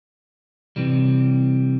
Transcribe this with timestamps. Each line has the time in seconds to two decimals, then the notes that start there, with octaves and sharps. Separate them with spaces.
0.76 C3 E3 G3